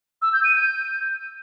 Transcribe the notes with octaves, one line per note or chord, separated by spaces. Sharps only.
E6
G6
D#7
G6